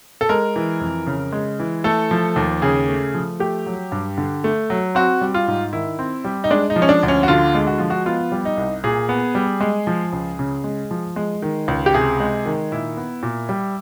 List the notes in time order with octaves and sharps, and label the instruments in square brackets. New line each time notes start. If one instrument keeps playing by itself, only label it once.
[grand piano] A4
G#3 A#4
E3
F2
C#3
G#3
E3
A3 A4
F3
D#2
C#3 G#4
A3
F3
A3 G4
F#3
G2
D3
A3
F#3
C4 F#4
G3
F4
G#2
D#3 E4
C4
G3
D#4
G#3 D4
D#4
F3
C#4
D4
D2
C#4
F#4
D3 F4
G#3
F#4
F3 F4
F#4
B3 F4
G3
D#4
C2
A#2 G#4
B3
G3
G#3
F3
C#2
C#3
G#3
F3
G#3
D#3
C#2
G4
C3 G#4
G#3
D#3
A#2 E4
B3
A#2
G3